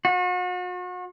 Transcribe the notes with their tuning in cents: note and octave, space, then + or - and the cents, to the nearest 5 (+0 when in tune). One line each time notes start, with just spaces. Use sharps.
F#4 -40